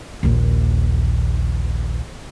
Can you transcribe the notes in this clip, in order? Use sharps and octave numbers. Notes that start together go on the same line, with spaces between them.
A#1 D#2